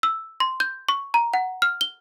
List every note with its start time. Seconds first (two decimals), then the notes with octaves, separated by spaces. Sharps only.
0.03 E6
0.40 C6
0.60 G6
0.89 C#6
1.14 A#5
1.34 F#5
1.62 F6
1.81 G7